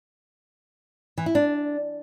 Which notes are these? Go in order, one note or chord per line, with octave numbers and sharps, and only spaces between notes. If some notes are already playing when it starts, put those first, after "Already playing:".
E3
E4
D4